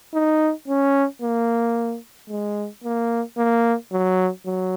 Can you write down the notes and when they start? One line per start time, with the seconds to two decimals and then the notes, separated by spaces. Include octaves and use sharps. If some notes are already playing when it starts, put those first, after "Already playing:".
0.14 D#4
0.68 C#4
1.22 A#3
2.30 G#3
2.84 A#3
3.37 A#3
3.92 F#3
4.46 F#3